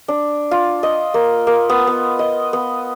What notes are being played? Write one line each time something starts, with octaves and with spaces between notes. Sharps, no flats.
D4
F4
D#5
A#3
A#3
B3
B3
D#5
B3